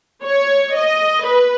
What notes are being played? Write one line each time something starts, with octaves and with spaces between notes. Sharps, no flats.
C#5
D#5
B4